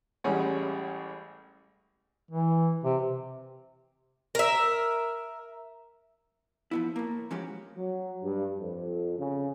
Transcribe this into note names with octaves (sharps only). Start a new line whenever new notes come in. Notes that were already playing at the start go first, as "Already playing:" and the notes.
A1 G3 G#3 C#4 G#4 F#5
E3
C3
A#4 E5
F3 B3 E4
A2 A#3
F3 G#3 C#4 F#4 G4
F#3
G2
F2
C#3